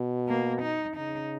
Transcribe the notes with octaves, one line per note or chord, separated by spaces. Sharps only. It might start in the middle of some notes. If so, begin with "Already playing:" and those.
Already playing: B2
A#3
D#4
C#3 D#4